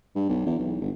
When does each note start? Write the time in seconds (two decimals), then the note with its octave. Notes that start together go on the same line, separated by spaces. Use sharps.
0.16 G2
0.29 B1
0.46 E2
0.59 B1
0.81 G1